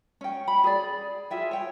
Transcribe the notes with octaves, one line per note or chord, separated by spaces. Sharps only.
C#4 G5
B5
G#4 D5
F4 G#4 E5 G5
C#5 G5